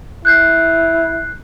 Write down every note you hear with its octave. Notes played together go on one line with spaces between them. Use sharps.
E4 F#6 G6 C7